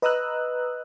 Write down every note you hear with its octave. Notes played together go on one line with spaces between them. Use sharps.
B4 D#5 A#5 D#6 E6 F#6